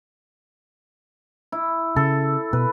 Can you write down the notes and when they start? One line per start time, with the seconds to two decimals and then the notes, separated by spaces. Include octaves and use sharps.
1.52 E4
1.96 C#3 A4
2.53 B2 B4